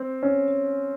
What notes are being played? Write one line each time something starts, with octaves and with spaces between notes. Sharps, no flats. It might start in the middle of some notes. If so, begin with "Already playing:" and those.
Already playing: C4
C#4